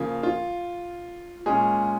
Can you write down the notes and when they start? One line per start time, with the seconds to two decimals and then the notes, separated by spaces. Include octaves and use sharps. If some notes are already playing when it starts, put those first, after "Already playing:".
Already playing: C#3 F3 A#3
0.23 F4
1.46 A#2 G#3 C#4 G#4